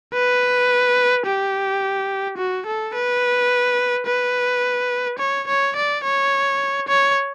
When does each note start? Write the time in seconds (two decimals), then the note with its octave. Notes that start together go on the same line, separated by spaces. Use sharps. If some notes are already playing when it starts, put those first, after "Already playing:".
0.14 B4
1.26 G4
2.37 F#4
2.66 A4
2.94 B4
4.06 B4
5.19 C#5
5.47 C#5
5.76 D5
6.04 C#5
6.88 C#5